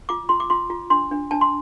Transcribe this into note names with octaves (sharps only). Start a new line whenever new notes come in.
F4 D6
F4 C6
D6
F4 C6
F4
D4 C6
D4
D4 A5
C6